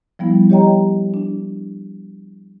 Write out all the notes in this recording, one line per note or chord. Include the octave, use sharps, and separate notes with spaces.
F3 G3 B3 E4
G4 C#5 D#5 G5 A#5
D4